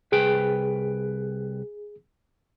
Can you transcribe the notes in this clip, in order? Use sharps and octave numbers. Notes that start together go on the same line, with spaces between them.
C2 G#4 B4 G5